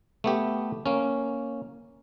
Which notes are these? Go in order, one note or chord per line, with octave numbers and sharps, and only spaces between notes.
A3 B3 G4
A#3 C#4